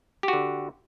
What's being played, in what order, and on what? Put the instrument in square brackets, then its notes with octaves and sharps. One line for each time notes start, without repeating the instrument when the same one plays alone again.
[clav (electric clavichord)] G4
F#4
D3